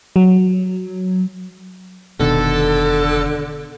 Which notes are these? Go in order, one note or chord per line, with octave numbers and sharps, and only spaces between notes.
F#3
F1 B2 D3 D#3 A4